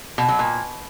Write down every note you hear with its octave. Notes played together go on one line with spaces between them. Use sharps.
B2
F#3
A#2